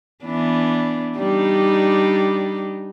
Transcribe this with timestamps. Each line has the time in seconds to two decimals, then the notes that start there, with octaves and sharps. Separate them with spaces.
0.24 E3 B3 D4
1.18 G3 D4 D#4